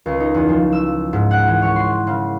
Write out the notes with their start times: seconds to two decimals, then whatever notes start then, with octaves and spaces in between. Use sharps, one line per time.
0.06 C#2
0.20 D#4
0.34 E2
0.48 F3
0.72 E6
1.13 G#2
1.31 F#5
1.47 E3
1.62 C#5
1.76 C6
2.07 C#3